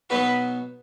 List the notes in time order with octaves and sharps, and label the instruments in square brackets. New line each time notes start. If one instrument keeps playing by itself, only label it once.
[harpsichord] B2 F#3 B3 D#4 F#4 [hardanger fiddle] B4